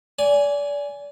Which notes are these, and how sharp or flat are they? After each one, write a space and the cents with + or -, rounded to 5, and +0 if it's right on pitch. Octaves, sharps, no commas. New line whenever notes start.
D5 -30 G#5 +0